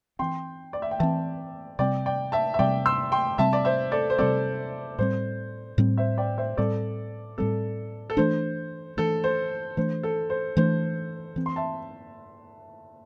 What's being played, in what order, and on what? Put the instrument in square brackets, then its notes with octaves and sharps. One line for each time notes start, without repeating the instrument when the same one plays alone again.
[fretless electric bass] E3 C4 [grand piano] G5 C6
[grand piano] D5
E5
G5
[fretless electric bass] E3 C4 [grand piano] E5 A5
[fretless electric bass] C3 G3 C4 [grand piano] D5 G5
[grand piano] D5 G5
E5 A5
E5
[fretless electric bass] C3 G3 C4 [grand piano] D5 G5
[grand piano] C6 E6
G5 C6
[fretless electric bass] C3 G3 C4 [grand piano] E5 A5
[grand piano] D5
C5 E5
A4 D5
C5
[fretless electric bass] C3 G3 C4 [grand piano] A4 D5
[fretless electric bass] A2 G3 C4 [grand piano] C5
[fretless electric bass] A2 G3 C4
[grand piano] C5 E5
D5 G5
C5 E5
[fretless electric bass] A2 G3 C4 [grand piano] A4 D5
[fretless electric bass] A2 G3 C4 [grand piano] A4
[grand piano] A4
[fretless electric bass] E3 A3 D4 [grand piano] C5
[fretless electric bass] E3 A3 D4 [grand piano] A4
[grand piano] C5
[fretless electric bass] E3 A3 D4 [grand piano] C5
[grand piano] A4
C5
[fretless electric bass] E3 A3 D4 [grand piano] C5
[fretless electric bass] E3 C4
[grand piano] C6
E5 A5